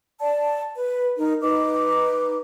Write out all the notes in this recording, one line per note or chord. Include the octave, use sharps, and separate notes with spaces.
D5 A5
B4
D#4 A#4
D#4 B4 D#5 D6